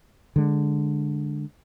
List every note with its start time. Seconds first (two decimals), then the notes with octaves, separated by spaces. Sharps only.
0.36 D3 G#3